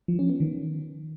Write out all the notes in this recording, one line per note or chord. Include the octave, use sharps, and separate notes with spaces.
F3
C#4
B3
D#3